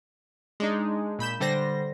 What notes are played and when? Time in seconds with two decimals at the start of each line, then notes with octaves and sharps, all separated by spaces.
0.60 G#3 D4 D#4
1.19 A#2 B5 G6 E7
1.40 D3 G3 C5 A#6